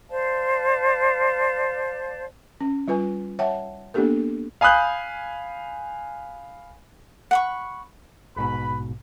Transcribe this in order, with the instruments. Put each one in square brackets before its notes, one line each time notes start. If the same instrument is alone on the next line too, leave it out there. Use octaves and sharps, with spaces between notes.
[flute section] C5 D5 F5 A5
[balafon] C#4
G3 F4 B4 G#5
C#5 E5 F#5 G5 A5
A#3 B3 D4 G4 A4 A#4
[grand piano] F5 G#5 B5 D#6 F#6 G6
[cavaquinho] F#5 B5 C#6
[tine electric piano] A#1 G#2 B2 [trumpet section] B4 B5